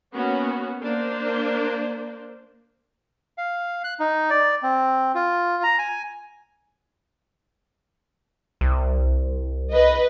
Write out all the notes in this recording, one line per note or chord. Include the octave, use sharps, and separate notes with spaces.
A#3 B3 C#4 F#4
A#3 D4 C5
F5
F#6
D#4
D5
C4
F4
A#5
G#5
C2
B4 D#5